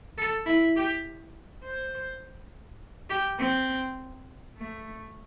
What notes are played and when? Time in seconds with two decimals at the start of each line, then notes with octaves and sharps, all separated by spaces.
0.18 A4
0.46 E4
0.76 G4
1.64 C5
3.10 G4
3.39 C4
4.57 A3